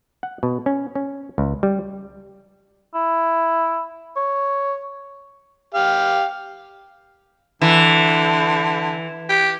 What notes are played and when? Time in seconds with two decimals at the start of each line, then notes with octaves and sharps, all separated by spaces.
0.23 F#5
0.43 B2
0.66 C#4
0.95 C#4
1.38 C#2
1.63 G3
2.95 E4
4.16 C#5
5.74 G4 F5
7.62 D3 E3
9.29 G4